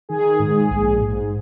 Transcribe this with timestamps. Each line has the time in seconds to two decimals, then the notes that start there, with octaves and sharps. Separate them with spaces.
0.09 D#3 G#4
0.39 G#2
0.71 A#1
1.01 G#2